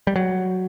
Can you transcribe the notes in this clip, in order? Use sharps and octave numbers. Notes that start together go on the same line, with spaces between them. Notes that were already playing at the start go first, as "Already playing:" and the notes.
G3
F#3